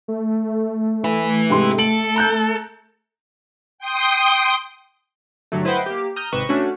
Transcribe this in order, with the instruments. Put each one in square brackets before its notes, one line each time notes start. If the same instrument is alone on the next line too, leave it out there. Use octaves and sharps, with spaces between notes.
[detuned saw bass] A3
[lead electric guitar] E4 B4
[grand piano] G#2 C3 C6
[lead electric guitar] A4 [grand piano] D7 F#7
[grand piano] A#5 F#6 G6
[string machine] G5 C6 D#6
[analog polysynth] G2 D3 F#3 A3
E4 B4 C5 D#5 F#5 G5
A#3 G4
A#5 D#6 F6 G6
G#1 C3 B4 D#5 C#6 E7
A3 C#4 D4 F#4